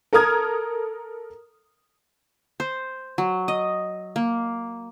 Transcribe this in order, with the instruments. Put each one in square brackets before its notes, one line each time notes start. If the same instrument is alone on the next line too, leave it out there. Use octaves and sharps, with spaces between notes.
[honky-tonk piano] A4 A#4 A#5 D#6 F6 G#6
[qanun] C5
F#3
D#5
A#3